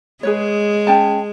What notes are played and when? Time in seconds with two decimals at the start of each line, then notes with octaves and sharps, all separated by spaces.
0.23 G#3 G#4 B4 C#5
0.87 C#4 G5 A5